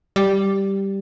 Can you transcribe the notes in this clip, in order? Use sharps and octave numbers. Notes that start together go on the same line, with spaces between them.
G3